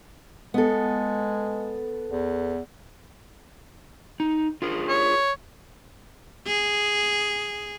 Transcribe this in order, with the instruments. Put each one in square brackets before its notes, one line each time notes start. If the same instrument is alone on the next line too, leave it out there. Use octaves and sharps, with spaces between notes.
[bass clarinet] G#3 [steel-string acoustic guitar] B3 A4
[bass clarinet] E2
[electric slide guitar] D#4
F4 G#4 A#4
[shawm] C#5
[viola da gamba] G#4